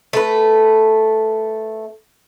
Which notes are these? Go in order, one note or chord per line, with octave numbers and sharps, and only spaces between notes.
A3 B4